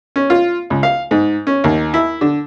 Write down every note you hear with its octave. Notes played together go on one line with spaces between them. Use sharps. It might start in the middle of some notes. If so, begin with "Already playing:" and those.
C#4
F4
C#2
F5
G#2
C#4
D#2
E4
D3